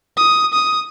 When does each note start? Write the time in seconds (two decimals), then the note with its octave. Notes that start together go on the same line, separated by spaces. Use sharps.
0.17 D#6
0.53 D#6